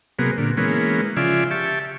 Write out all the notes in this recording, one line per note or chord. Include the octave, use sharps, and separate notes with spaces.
C3 F#3 A#3 B3 G#4
A#2 D3
E3 G#3 A#3 B3 C#4
C#3 F3 F4 D5 E5 G#5
G4 E5 A5 C#6